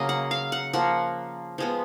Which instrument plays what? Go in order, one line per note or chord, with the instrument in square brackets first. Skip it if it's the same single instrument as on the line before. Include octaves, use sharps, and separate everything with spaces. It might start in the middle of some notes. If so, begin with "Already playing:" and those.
Already playing: [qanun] C#3 F#3 A#3 D#5
F#5
F5
F#5
F3 A#3 F#5
F3 G#3 B3